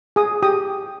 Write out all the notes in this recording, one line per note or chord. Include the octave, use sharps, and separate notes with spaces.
G#4 G#5 D#6
G4 G5 D#6